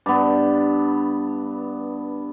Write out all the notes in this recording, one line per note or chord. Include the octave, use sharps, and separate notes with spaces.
G2 B3